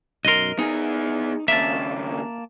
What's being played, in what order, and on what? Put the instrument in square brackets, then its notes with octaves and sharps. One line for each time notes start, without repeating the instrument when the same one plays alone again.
[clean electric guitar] B1 F#2 C6 [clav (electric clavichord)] A#4 D#5
[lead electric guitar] B3 G#4 [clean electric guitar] D#4
[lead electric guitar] D#2 C#3 [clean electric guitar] A#3 A5 [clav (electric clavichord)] E5